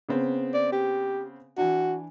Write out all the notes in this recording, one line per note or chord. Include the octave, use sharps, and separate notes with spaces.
C#3 B3 C4
D5
G4
E3 D4 F#4